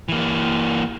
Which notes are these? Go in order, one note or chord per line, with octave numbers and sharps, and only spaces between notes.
E3 A#3